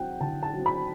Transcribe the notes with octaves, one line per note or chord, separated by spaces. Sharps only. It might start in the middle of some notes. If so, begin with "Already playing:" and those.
Already playing: F#3 C4 F#5 G5
D3 A5
A5
F#3 C4
B5